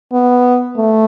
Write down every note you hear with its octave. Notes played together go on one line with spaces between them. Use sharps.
B3
A3